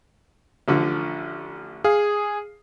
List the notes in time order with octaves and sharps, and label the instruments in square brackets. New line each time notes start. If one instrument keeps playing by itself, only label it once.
[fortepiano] A1 D3 F3
[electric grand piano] G#4 [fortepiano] F5